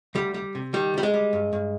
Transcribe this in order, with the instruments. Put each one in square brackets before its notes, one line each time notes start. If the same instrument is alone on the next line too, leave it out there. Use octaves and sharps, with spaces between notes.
[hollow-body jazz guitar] D2 G3
G3
C3
D#3 G3
D2 G3
G#3
G3
G2
G2